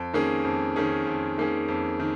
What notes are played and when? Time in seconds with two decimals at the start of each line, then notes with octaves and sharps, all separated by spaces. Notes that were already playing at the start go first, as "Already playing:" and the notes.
Already playing: F2
0.13 D#3 A#3 C#4 G#4
0.45 F2
0.76 D#3 A#3 C#4 G#4
1.07 F2
1.38 D#3 A#3 C#4 G#4
1.68 F2
2.00 D#3